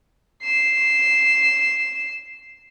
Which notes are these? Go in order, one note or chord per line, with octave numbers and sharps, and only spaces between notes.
C7 E7